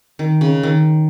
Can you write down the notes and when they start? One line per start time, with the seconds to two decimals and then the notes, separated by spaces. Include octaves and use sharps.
0.19 D#3
0.41 C#3
0.63 D#3